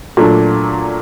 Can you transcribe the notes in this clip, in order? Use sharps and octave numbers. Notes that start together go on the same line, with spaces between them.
A#2 F#3 A3 D4